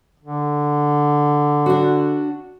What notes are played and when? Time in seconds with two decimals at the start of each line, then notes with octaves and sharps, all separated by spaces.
0.20 D3
1.66 D4 F#4